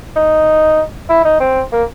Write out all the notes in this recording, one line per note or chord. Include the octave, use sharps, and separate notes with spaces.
D#4
E4
D#4
C4
A#3